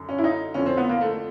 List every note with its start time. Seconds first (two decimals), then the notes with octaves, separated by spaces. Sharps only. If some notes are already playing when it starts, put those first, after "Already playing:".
Already playing: F#2 D3
0.09 C#4
0.18 E4
0.24 D#4
0.54 F2 D3 C#4
0.66 C4
0.77 B3
0.89 A#3
1.01 A3